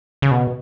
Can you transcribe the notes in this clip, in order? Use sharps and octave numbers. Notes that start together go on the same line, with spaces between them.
C#3
B2